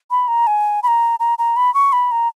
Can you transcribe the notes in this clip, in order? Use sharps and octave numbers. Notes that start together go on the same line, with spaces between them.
B5
A#5
G#5
B5
A#5
A#5
A#5
B5
C#6
B5
A#5